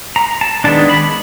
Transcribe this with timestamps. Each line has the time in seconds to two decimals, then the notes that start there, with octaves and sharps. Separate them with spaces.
0.16 A#5
0.41 A5
0.64 D#3 G#3 B3 D4 A5
0.89 B5